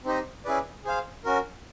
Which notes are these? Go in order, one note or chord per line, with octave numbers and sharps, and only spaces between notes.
C4 D#4 G4 C5 D#5
C#4 E4 G#4 B4 D5
G#4 C5 F5
C#4 F#4 A#4